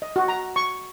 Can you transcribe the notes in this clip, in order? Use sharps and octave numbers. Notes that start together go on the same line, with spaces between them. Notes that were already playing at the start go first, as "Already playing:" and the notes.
D#5
F#4
A#5
C#6